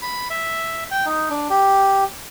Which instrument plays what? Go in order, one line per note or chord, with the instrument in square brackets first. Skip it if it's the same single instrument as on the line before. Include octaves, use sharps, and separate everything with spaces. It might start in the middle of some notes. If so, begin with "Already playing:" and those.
[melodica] B5
E5
G5
D#4
D4
G4